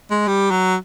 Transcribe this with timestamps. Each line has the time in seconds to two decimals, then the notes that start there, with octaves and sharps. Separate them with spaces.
0.10 G#3
0.28 G3
0.51 F#3